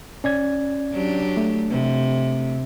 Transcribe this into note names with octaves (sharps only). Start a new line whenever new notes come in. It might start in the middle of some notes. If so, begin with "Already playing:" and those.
C#4 D5 G#6
F#3 D4 G4
A3
C3